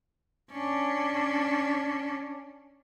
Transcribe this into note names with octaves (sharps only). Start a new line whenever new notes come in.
C#4 D4